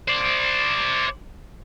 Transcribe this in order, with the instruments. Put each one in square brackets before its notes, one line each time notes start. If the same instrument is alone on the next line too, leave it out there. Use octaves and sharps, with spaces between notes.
[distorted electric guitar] C5 D5